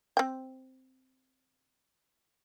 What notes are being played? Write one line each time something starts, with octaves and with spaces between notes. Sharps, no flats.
C4 G5